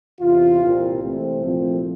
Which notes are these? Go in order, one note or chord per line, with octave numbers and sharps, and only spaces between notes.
E2 C3 E3 F4
C2 A#2 G3 C4
C2 C3 E3 A3 C4
C2 A#2 F3 A3 C4